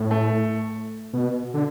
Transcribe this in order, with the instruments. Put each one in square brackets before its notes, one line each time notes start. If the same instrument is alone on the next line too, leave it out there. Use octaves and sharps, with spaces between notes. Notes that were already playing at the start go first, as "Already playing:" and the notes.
Already playing: [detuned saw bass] A2
[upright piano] A3
[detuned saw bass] B2
D3